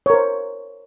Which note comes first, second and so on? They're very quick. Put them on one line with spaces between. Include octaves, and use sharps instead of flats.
C#5 A#4 C5